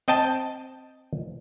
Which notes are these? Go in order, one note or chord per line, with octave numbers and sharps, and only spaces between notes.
C4 D#5 G5 A5